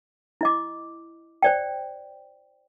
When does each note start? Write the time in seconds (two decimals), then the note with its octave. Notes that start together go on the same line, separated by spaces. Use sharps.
0.41 E4 D#5 D6
1.42 C5 D5 G5